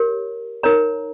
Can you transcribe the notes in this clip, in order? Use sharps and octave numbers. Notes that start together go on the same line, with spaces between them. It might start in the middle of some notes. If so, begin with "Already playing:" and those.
Already playing: G4 A#4 C#5
D#4 A#4 C#5 A#5